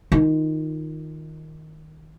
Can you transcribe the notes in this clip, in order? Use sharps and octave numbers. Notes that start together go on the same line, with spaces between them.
D#3 F4